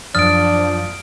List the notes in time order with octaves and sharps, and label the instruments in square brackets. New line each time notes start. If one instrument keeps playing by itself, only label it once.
[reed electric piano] F#2 D#6 A6 [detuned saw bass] F3 [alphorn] D4 [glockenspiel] F6 D7